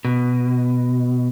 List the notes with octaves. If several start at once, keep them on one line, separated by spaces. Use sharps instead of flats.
B2